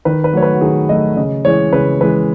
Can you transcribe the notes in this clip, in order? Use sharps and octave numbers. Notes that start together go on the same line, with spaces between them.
D#3 B4
B4
F#3 A3 C#5
B4
F#4
D#3 G#4
F#3 A3 D#5
C#3 D#5
E3 G#3 C#5
C#3 B4
E3 G#3 B4